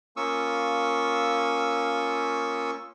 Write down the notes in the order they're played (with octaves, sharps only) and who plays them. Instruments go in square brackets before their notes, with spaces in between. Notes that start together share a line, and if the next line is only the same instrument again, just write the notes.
[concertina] A#3 C#4 F4 C#6 D#6 E6